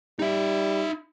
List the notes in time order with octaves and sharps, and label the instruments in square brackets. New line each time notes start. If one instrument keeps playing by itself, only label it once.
[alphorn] G3 [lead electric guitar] D#4 E5